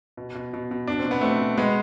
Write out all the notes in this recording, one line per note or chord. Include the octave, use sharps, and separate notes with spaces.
B2
B2
B2
B2
B2 D4
C4
B2
B3
B2 A3 C4
B2
B2 G#3 B3